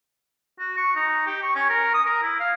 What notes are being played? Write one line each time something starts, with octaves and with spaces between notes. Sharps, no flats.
F#4
C#6
D#4
G4
C#6
C#4
A#4
D#6
A#4
E4
F5